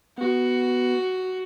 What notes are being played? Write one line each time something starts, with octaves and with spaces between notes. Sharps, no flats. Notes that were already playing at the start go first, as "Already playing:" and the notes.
B3 F#4